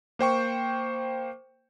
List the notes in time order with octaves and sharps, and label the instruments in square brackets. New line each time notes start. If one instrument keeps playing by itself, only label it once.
[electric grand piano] A#3 C5 G5 C#6